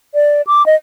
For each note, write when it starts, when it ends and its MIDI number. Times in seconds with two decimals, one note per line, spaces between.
0.15 0.42 74
0.47 0.65 86
0.66 0.75 75